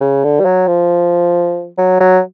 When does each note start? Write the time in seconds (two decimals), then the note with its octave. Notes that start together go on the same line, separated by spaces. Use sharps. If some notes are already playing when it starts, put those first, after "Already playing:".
0.01 C#3
0.24 D3
0.40 G3
0.45 F#3
0.68 F3
1.78 F#3
2.00 F#3